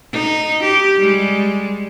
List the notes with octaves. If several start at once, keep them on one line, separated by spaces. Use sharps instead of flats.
D#4
G4
G3 G#3